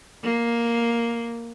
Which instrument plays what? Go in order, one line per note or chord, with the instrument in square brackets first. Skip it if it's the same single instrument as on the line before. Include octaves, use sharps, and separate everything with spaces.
[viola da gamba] A#3